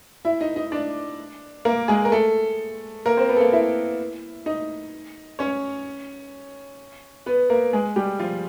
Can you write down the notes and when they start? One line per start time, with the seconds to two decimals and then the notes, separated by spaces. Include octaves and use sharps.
0.25 E4 E5
0.41 D#4 D#5
0.56 D#4 D#5
0.72 D4 D5
1.65 A#3 A#4
1.88 G#3 G#4
2.05 A#4
2.12 A3 A4
3.06 A#3 A#4
3.17 C4 C5
3.28 B3 B4
3.37 A4
3.40 A#3 A#4
3.52 E4 E5
4.46 D#4 D#5
5.39 C#4 C#5
7.26 B3 B4
7.50 A#3 A#4
7.73 G#3 G#4
7.96 G3 G4
8.19 F3 F4